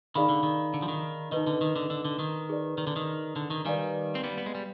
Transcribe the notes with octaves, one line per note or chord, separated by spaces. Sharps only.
D#3 D#4 G#4 D5 F5 B5
D3
D#3
D3
F3
D#3
D#3 D#4 B4 D#5
D3
D#3
D3
D3
D3
D#3
D#4 G#4 B4 D5
D#3
D3
D#3
D3
D#3
D#3 G3 B4 D5 F5 G#5
C4
G3 B3
B3
G#3
G3